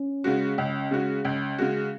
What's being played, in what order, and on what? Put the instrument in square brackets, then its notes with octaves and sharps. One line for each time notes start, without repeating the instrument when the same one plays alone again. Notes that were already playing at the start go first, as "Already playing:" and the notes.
Already playing: [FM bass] C#4
[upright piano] C#3 G#3 F#4
C#2
C#3 G#3 F#4
C#2
C#3 G#3 F#4